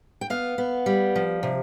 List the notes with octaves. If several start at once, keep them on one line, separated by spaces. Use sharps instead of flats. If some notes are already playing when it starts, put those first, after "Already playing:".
G5
B3 F5
B3
G3
F3
C3